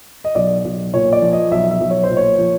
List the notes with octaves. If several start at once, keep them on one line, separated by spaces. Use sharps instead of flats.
D#5
B1 D5
B1
A#2 C#5
D5
F3
D#5
B1 E5
E5
B1
C#5
C5
A#2
C#5
F3